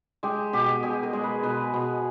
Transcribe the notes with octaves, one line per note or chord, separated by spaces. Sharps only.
G#3 G4
B2 G4
B2 G#4
A#4
G#3
B4
B2 B4
B2